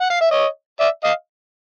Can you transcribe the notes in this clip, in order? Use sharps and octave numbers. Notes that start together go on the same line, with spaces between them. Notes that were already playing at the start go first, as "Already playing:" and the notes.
F#5
F5
E5
C#5 D#5
D5 E5
D#5 F5